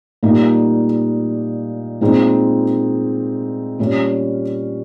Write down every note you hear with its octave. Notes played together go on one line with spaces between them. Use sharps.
A#2 G3 A#3 D#4
A#2 G#3 C4 D#4
A#2 G3 C#4